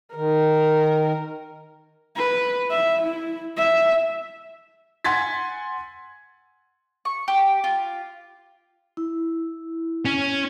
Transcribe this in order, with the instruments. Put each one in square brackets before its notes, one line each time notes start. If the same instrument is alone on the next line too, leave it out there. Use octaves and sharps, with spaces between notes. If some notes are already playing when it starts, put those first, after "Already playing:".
[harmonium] D#3 [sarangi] A#4
[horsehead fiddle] B4
E5
E4
E5
[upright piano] F#5 G#5 C6 G#6 A6 B6
[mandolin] C#6
G4
F4
[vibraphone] E4
[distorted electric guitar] C#4